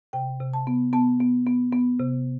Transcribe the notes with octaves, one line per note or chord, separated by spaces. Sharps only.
C3 G5
C3
A5
B3
B3 A5
B3
B3
B3
C3